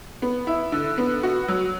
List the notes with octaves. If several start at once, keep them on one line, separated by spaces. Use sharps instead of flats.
B3
E4
D3
B3
F#4
F#3